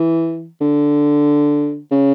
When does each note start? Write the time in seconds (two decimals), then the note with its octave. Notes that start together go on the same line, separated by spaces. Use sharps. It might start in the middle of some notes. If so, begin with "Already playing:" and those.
Already playing: E3
0.61 D3
1.91 C#3